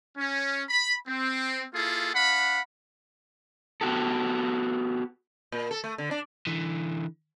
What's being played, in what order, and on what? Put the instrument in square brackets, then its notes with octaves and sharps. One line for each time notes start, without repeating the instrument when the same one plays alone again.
[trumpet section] C#4
B5
C4
A#3 E4 F4 G#4 A4
D4 F5 F#5 B5
[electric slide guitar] B3 F#4 G4 A4
[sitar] A#2
A4
A3
D3
D4
[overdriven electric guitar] D3 E3